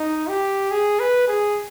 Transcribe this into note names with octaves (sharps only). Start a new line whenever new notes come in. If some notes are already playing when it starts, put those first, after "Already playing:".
Already playing: D#4
G4
G#4
B4
G#4